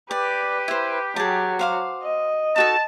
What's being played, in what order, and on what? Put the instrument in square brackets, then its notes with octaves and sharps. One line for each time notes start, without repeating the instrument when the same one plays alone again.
[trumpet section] G4 [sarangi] B4 [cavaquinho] D5
[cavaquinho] E4 C5
[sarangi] F#3 [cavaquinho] G#4 A5
[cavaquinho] C5 F5 D6
[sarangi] D#5
[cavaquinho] D#4 F#4 A4 [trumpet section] A5